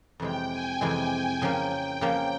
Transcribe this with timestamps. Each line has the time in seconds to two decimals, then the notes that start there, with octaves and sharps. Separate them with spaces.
0.20 F2 C3 E3 G#3 G5
0.52 G#5
0.81 F2 C3 E3 G#3 G5
1.42 C#3 F3 A#3
2.01 C#3 F3 A#3 G5